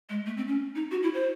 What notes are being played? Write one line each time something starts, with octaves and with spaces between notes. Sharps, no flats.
G#3
A3
C4
C#4
D#4
F#4
E4
C5